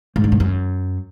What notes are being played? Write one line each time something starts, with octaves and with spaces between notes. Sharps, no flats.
G#2
D3
G#2
F#2